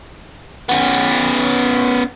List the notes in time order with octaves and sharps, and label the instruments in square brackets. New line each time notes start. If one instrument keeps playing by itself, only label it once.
[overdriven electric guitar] B3 C#4